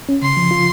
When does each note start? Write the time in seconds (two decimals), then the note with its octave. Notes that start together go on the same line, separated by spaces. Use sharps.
0.09 C#4
0.22 C#3 C6
0.37 F3
0.51 F4